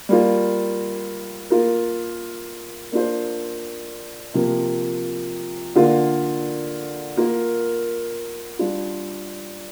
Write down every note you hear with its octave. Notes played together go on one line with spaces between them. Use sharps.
G3 A#3 F4
A#3 F4 A#4
A#3 D4 F4 C5
C3 F3 A#3
D3 A#3 F4 A#4
A#3 F4 A#4
G3 D4 F4